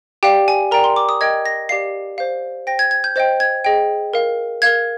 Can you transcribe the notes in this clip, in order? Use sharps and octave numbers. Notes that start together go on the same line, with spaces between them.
G4 D5 F5 G5
G#5
A#4 D5 G5 A#5
C6
D6
D#6
A#4 D#5 G5 G#6
A#6
G4 D5 F5 C7
C5 F5
C5 G5 A#6
G#6
G#6
G6
C5 D#5 G5 G6
G#6
G#4 D#5 G5
A#4 F5
A#4 F5 G#6